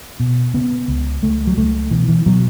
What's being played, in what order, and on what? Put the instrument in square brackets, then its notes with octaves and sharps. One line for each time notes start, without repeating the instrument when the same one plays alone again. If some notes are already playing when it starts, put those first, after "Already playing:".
[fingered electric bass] B2
C#3 B3
C#2
C#2 A3
F#3
C#2 A3
B2 E3
E3
B2 F#3